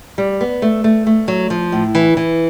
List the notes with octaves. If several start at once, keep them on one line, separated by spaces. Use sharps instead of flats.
G3
B3
A3
A3
A3
F#3
F3
A2
E3
E3